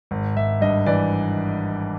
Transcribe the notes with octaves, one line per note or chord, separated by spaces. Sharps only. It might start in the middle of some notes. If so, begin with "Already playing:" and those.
G#1
G#1 E5
G2 D#5
E3 D5